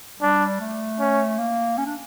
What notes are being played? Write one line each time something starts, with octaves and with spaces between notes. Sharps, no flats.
G3 D4
A3
C#4
A#3
C#4
D4